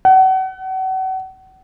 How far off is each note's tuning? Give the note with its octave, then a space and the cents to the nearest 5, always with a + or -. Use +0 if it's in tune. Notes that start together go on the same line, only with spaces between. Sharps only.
F#5 +35